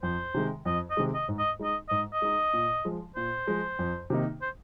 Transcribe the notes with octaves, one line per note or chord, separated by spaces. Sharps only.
F2 C5
C3 D#3 G#3
F2 D#5
D#5
C3 D#3 G#3
D#5
G#2
D#5
G#3 D#4 D#5
G#2 D#5
D#5
G#3 D#4
A#2
F3 G#3
A#2 C5
F3 G#3
F2
C3 D#3 A#3 D#4
C5